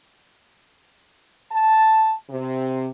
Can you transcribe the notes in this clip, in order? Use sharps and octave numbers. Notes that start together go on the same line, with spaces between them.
A5
C3